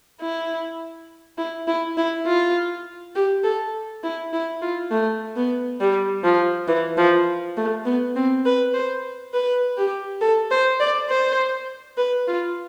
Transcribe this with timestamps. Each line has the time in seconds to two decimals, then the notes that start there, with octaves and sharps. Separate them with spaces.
0.21 E4
1.38 E4
1.67 E4
1.97 E4
2.26 F4
3.15 G4
3.44 A4
4.04 E4
4.33 E4
4.62 F4
4.91 A3
5.36 B3
5.80 G3
6.24 F3
6.68 E3
6.98 F3
7.57 A3
7.86 B3
8.16 C4
8.46 B4
8.74 C5
9.34 B4
9.78 G4
10.21 A4
10.51 C5
10.80 D5
11.09 C5
11.98 B4
12.28 F4